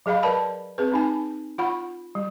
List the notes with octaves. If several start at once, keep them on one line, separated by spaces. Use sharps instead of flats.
F#3 G#4 D#5 F5 B5
A#4 B4 D5 A5 B5
C4 G#4 B4
C4 D#4 G#5
F4 F#5 B5
G3